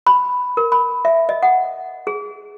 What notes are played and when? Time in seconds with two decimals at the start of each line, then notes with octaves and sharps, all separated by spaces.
0.07 B5
0.57 A#4
0.72 B5
1.05 E5
1.29 D#5
1.43 F#5
2.07 G#4